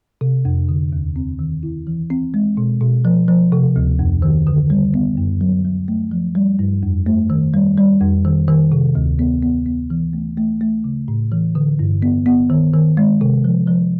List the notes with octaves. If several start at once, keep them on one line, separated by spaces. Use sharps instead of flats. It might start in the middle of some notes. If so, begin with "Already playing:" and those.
C3
F2
D3
D#2
C4
D#3
E4
E3
C4
G#3
B2
B2
F3
F3
C3
D2
F2
D#3
D3
G3
B3
F#2
F#3
F#3
A3
F3
G3
G2
F2
A3
D#3
G3
G3
F2
D#3
D#3
C3
D2
B3
B3
B3
E3
A3
A3
A3
C#3
A2
E3
D3
G2
B3
B3
D#3
D#3
G#3
C3
F3
F3